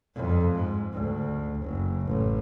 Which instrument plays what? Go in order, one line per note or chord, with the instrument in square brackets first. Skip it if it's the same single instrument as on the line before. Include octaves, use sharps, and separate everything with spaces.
[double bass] F2
G#2
D2
F#1
A1